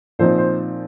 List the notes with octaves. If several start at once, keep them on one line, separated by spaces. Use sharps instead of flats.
A#2 F3 C4 D#4 C5
C5